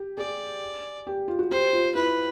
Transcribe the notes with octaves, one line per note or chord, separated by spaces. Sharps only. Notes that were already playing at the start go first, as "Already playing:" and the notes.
Already playing: G4
G#4 D5
G4
F4
F#4
G4 C5
F4
E4 B4